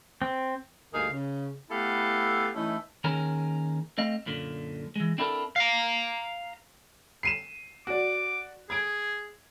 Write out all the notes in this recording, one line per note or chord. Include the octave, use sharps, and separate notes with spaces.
C4
D2 G2 A#3 D#4 G#4 F5
C#3
A3 B3 E4 G4 A4 F5
E3 A3 C#4 D#4 E4
D#2 D#3 C#4 G#4 A#4
A3 C4 D#5 F5
F#2 A#2 D3
E3 G#3
C4 D4 E4 F#4 A4 A#4
F5 A#5
C7 D#7 E7
F#4 D5 D6
G#4 G#6 D7